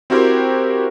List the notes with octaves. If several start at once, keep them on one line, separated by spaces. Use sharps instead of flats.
C4 E4 F#4 G4 A#4 C5